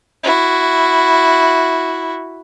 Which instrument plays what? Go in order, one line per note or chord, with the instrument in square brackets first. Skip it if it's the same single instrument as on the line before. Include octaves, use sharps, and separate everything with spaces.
[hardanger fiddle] E4 F#4